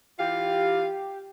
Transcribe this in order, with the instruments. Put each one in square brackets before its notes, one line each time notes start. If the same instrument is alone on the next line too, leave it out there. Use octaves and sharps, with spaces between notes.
[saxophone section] E3 F4 F5 [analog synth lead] G4